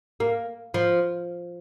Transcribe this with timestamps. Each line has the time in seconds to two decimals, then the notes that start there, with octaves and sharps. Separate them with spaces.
0.20 A#3
0.74 F3